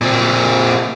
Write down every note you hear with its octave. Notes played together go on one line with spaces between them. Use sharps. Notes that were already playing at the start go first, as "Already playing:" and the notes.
A#2 C4